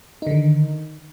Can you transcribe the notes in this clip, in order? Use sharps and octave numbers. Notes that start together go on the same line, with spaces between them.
D3 D#3 D#4